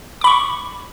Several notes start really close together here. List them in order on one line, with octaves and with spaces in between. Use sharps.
D6 B5 C#6